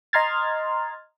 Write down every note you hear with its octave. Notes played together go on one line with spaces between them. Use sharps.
D#5 A#5 C6 F6 G#6 A6